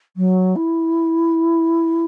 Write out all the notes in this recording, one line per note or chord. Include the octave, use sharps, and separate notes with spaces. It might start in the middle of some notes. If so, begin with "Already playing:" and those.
F#3
E4